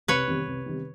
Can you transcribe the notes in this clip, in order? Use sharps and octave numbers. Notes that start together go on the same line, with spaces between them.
C2 B4 C#5
C3 D#3 G3 B3
C2
C3 D#3 G3 B3